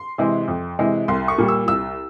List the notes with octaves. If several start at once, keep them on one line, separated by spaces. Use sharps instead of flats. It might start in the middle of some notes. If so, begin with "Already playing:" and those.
Already playing: C6
C3 E3 G#3
F2
C3 E3 G#3
C2 C6
C#6
A#2 G3
E6
C2 E6